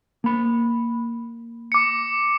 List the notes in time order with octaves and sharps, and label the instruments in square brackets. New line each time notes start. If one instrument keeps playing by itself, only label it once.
[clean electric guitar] A#3 B5
[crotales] D6 C#7